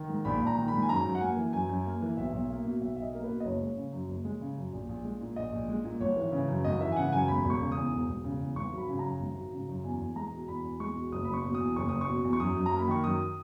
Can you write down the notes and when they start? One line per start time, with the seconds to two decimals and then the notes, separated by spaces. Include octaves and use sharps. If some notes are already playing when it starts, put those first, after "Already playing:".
Already playing: D#3
0.09 G#2
0.25 A#1 B5
0.41 A#1
0.47 A#5
0.57 D#3
0.68 B5
0.73 G#2
0.82 G#5
0.89 F#2 A#5
1.05 F#2
1.15 F#5
1.21 A#3 G#5
1.37 E3
1.53 F#2 G#5
1.69 F#2
1.86 A#3
2.01 E3
2.17 B1 E5
2.33 B1
2.49 A#3
2.65 B2
2.81 B1 E5
2.96 B1 E5
3.02 D#5
3.13 A#3 A#4
3.24 B4
3.29 B2
3.40 D#5
3.45 F#1 C#5
3.61 G#3
3.77 C#3
3.93 F#2
4.08 F#1
4.25 G#3
4.41 C#3
4.57 F#2
4.72 A#1
4.89 A#1
5.05 G#3
5.21 A#2
5.36 A#1 D#5
5.53 A#1
5.68 G#3
5.84 A#2
6.00 G#1 C#5
6.17 E3
6.32 C#3
6.48 F#2
6.64 G#1 D#5
6.80 E3 E5
6.92 G#5
6.96 C#3 F#5
7.12 F#2 G#5
7.28 E1 B5
7.45 E1
7.50 C#6
7.61 C#3
7.72 E2 D#6
7.92 E1
8.09 E1
8.24 C#3
8.40 E2
8.56 G#1 C#6
8.72 F#3
8.78 B5
8.88 C#3
8.99 F#2 A#5
9.20 G#1
9.36 F#3
9.52 C#3
9.68 F#2
9.84 E2 G#5
10.00 E2
10.16 G#3 A#5
10.32 B2
10.48 E2 B5
10.64 E2
10.80 G#3 C#6
10.96 B2
11.12 F#1 D#6
11.25 F#1 B5
11.33 C#6
11.44 B2
11.54 D#6
11.60 E2
11.76 F#1 C#6
11.89 F#1 D#6
12.01 C#6
12.08 B2
12.24 E2
12.33 C#6
12.40 F#2 D#6
12.56 F#2
12.66 A#5
12.72 A#3
12.79 B5
12.88 D#3 C#6
13.04 F#2 D#6